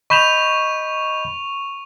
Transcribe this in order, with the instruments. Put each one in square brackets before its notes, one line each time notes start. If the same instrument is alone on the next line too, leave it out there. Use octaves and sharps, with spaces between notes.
[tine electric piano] D#5 B5 G6 [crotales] C#6 E7 F7